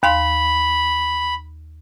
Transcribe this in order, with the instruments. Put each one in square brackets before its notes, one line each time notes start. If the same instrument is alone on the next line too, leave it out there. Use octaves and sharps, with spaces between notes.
[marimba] D#2 F5 C6 [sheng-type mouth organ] B5